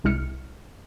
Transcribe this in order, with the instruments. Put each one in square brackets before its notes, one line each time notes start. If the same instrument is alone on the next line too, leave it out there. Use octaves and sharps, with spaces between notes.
[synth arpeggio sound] C2 G#3 E4 F6 C#7